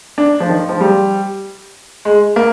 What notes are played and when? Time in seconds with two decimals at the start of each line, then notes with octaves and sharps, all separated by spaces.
0.18 D4
0.40 F3
0.49 D#3
0.69 F3
0.81 G3
2.05 G#3
2.36 A#3